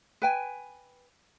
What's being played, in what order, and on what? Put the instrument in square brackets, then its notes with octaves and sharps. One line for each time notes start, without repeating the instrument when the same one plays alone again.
[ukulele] B4 G5 G#5